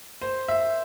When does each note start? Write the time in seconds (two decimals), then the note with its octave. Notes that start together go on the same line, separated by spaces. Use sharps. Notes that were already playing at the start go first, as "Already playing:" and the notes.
0.21 C5
0.48 E5